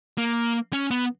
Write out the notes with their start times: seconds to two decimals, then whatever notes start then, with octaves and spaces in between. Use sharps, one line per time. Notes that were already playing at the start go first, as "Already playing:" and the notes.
0.18 A#3
0.73 C#4
0.91 B3